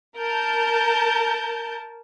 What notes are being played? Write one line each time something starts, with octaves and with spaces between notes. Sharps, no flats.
A#4 A5 G6